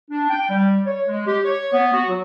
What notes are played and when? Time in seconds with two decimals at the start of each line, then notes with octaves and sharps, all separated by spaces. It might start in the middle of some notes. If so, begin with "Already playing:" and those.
0.09 D4
0.29 G5
0.49 G3
0.85 C#5
1.07 G#3
1.27 G4
1.44 C#5
1.73 B3
1.93 F#4
2.08 F#3